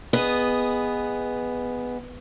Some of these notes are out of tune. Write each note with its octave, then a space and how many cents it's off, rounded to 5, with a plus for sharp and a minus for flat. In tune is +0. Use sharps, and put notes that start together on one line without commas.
B3 +0 G#4 -15 D#5 +0